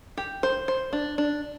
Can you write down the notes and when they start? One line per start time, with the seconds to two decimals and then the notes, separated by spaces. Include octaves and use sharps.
0.18 G4
0.43 C5
0.68 C5
0.93 D4
1.18 D4